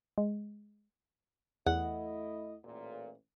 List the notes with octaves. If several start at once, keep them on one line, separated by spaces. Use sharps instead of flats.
G#3
E2 A3 E4 D#5 F#5
A1 A#2